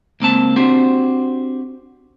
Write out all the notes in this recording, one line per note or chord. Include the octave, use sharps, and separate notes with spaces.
C#2 A#3 C4 A5
C4 D4 F#4 G4 C5